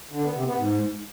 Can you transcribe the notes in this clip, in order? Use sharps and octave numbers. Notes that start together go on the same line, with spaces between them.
D3
B3
C3
B3
G#2